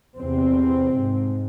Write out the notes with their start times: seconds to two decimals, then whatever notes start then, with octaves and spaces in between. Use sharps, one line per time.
0.18 E2 C3 C4
0.95 G#2